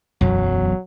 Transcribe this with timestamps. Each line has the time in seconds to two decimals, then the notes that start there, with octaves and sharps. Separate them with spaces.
0.21 E1 B1 F#2 F#3